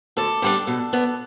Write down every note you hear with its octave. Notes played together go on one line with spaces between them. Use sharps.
D2 A4 D5
D3 G3 D4
B2
B3 D4